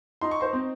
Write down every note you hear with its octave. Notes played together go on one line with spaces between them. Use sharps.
D#4 C6
C#6
C5 C6
C4